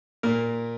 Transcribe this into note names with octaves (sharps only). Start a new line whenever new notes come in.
A#2 A#3 A#4